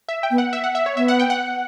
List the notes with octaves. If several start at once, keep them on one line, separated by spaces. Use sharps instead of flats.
E5
G5
B3
F#5
E5
F#5
E5
C#5
B3 E5
F#5
G5
F#5